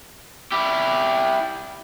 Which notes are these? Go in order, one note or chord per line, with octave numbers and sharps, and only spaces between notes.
E4 G4